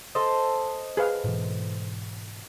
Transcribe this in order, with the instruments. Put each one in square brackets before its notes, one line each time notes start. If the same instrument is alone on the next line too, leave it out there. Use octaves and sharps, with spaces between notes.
[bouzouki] A4 C5 D#5
[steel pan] G#4 B4 F5
[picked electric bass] G#2 B2 E3